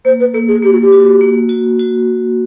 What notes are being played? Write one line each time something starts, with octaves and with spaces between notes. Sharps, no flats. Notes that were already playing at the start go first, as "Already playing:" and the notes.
A#3 C5
B4
A#3 A4
G#4
A#3 G4
F#4
G4
F#4
A#3
F#4
F#4